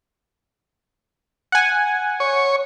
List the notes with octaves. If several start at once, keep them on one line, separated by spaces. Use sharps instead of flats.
F#5 G#5
C#5